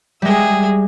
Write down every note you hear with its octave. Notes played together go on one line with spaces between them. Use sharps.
G3 G#3 G#4 E5